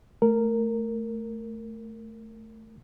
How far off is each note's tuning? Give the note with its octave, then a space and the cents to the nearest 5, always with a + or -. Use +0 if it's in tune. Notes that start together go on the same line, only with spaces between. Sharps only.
A3 +0 A#4 -10